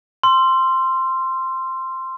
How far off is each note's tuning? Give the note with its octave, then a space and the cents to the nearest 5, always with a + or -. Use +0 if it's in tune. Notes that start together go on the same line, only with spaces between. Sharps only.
C6 +0 E6 +40